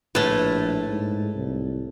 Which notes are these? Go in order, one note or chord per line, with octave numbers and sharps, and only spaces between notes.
A#1 A2 A3 B4
G#2
C2